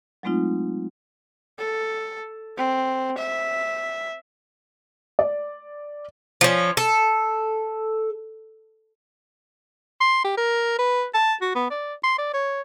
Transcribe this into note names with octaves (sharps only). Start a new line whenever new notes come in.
F#3 G#3 A3 C4 D#4 F4
A4
C4
E5
D5
F3 C#4
A4
C6
G4
A#4
B4
A5
F#4
B3
D5
C6
D5
C#5